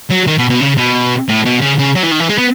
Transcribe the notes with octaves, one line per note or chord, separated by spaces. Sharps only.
F#3
D#3
B2
B2
C#3
B2
A2
B2
C#3
C#3
F#3
E3
D#3
E3
G#3
B3